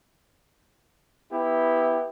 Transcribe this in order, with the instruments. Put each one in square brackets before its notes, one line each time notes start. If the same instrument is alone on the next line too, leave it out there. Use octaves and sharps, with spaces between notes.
[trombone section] B3 E4 G4